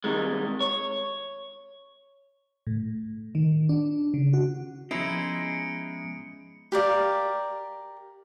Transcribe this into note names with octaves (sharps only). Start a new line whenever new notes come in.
C3 D#3 G3 G#3
C#5
A2
D#3
D4
C#3
F#4
F3 G#3 B3 C#4 D#4 E4 C#7 D7
G4 A#4 D5 F5